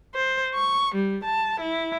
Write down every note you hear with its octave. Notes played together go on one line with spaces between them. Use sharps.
C5
C#6
G3
A5
E4